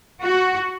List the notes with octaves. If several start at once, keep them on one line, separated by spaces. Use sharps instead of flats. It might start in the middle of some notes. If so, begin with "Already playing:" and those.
F#4